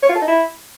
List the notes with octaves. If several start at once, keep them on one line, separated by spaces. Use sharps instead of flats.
C#5
F4
A4
D#4
E4